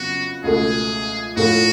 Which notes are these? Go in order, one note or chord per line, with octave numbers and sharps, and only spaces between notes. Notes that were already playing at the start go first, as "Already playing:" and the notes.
Already playing: F2 C#3 F#3 B3 F#4
C#2 B2 A3 G#4
A2 F3 A3 F4 F#4